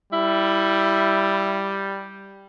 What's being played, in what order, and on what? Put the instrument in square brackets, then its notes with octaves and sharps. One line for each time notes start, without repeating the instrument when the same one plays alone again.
[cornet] G3 [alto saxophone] E4